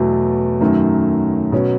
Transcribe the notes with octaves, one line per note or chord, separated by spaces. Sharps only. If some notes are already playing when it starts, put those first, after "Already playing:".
Already playing: E2 B2 F#3 A3
F#2 D#3 F#3 A3
B2 F#3 C#4